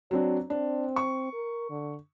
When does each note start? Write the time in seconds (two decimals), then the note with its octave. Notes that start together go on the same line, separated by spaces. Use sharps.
0.11 F#3 C4 D4 C#5
0.50 C4 D4
0.96 C#6
1.33 A#4
1.70 D3